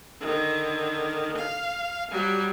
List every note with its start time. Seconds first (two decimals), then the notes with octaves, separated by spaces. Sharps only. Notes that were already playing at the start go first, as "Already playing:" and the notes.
0.21 D3 D#3
1.38 F5
2.11 F#3 G3